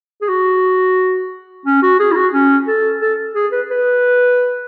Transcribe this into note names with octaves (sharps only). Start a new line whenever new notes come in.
G#4
F#4
C#4
F#4
G#4
E4
F#4
C#4
A4
A4
G#4
B4
B4